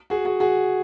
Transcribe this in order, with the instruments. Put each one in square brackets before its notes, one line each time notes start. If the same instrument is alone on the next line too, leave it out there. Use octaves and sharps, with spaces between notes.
[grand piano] F#4 G#4
F#4 G#4
F#4 G#4